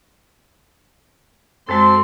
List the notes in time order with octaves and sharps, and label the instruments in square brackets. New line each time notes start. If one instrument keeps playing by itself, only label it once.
[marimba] F#2 G#3 F#4 [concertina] C4 A4 [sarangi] C6